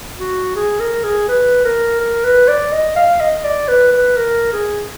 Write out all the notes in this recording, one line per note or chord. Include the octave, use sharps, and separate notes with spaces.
F#4
G#4
A#4
G#4
B4
A#4
A#4
B4
D5
D#5
F5
D#5
D5
B4
B4
A#4
G#4